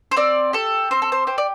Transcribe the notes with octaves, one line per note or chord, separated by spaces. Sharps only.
C5
C4 D5
G4 A4
C4 C5
A4
C5
G4 C5
D5